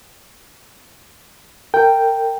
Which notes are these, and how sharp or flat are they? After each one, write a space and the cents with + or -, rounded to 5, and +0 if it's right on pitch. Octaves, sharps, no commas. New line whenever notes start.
A#4 -30 G5 +0